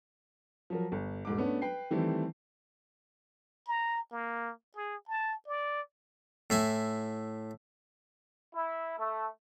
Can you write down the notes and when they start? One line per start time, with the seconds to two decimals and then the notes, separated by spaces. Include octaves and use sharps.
0.70 F3 F#3 A#4
0.92 G1
1.25 E1 G#2 D6
1.37 A3 B3 C#4 D4
1.62 B4 G5 C7
1.91 D#3 E3 G3 A3 C4 E4
3.67 A#5
4.12 A#3
4.76 G#4
5.08 A5
5.47 D5
6.50 A2 E4 G#5
8.54 E4
8.98 A3